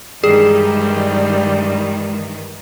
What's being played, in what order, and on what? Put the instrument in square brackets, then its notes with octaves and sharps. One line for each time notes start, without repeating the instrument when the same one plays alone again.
[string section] G2 D#3 E3 [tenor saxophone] G3 [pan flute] G#3 [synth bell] G#4